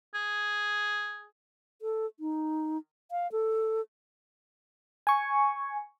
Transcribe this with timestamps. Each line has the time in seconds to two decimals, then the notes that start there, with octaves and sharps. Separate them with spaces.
0.15 G#4
1.82 A4
2.20 D#4
3.11 F5
3.32 A4
5.07 G#5 C#6